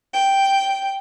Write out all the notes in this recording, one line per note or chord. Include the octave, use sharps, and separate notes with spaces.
G5